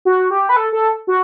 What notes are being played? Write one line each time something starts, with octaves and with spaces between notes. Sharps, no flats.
F#4
G4
B4
A4
A4
F#4